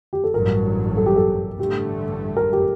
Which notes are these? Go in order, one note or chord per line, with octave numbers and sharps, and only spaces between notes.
G4
A4
A1 G2 F#3 A#4
A4
G4
A4
A1 G2 D3 A3 G4
A#4
G4